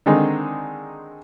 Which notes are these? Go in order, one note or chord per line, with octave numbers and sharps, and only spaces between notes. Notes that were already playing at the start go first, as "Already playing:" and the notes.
D3 D#3 G#3 C4 D#4